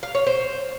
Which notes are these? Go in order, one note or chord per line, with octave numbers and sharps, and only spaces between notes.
F5
C#5
C5